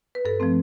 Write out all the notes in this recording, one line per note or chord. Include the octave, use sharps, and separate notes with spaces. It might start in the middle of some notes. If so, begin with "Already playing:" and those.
B4
G2 A4
F3 A3 C4